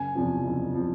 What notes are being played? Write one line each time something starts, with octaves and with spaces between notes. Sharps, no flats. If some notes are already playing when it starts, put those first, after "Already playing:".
Already playing: F#1 G#5
E2 C3 F3
F#1
C3 F3